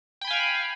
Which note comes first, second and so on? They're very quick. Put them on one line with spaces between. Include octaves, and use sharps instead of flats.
G5 B5 G#5 F5